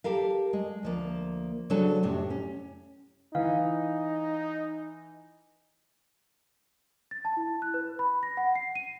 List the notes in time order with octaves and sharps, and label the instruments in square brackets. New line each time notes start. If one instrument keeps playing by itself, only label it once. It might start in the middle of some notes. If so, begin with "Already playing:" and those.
[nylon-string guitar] G4 A4 A#4 F5
G#3
D2 F3 A#3
C#3 F#3 C4 D4 G#4 A4
F2 A2 C3
C#4
[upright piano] E3 [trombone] D#4 [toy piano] F5
[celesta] A6
A5
E4
F#6
B4
B5
A#6
F#5
C7
D#7